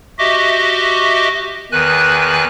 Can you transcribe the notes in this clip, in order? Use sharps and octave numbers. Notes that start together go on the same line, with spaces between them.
F#4 G4 D#5 E5 D6
E2 D#3 B4 G#5 F#6